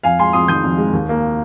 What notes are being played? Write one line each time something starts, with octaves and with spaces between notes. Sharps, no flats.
F2 F5 G#5
G#3 G#5 C6
F2 C6 D#6
D#3 D#6 G6
F2
G#3
D#2
A#3